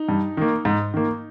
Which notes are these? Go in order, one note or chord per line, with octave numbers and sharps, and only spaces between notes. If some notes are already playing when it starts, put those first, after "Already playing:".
Already playing: D#4
G2
D#3 A#3
G#2
D#3 A#3